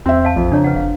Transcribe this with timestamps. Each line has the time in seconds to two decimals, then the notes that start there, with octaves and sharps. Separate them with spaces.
0.06 E2 C4 E5
0.25 F5 A5
0.36 A#1 F2
0.52 C#3 D4 C#5 A#5
0.64 B4 F#5
0.76 F#1 F5